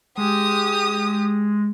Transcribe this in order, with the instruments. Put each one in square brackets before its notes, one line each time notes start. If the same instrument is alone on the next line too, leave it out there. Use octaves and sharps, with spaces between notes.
[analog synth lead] G#3 [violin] G4 D#6